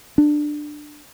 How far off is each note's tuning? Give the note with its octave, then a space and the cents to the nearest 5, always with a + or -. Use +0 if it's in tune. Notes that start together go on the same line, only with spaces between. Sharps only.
D4 +15